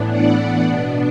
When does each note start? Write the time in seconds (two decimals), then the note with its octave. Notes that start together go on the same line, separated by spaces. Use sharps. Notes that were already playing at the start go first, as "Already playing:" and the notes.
Already playing: A2 E3 B3 D4
0.09 D5 F#5
0.61 B2 B3 D4